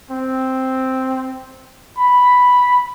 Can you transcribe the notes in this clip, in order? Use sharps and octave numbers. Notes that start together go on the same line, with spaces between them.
C4
B5